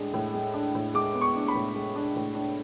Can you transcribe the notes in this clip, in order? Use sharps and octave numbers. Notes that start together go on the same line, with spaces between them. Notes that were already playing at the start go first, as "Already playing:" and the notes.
Already playing: A2 G#3 D4
A2
G#3
D4
A2
G#3 D6
B3
C#6
D4
B5
A2
G#3
D4
A2
D4